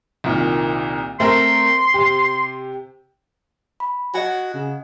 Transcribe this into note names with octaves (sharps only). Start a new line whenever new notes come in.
C2 A#2 D#3
A3 C4 A#4 C6
C3 G4
B5
F#4 D#5 F#5 G#5
C#3